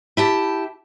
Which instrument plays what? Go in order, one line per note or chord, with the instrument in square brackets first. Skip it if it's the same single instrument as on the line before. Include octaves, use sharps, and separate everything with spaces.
[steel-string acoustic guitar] E4 G4 A5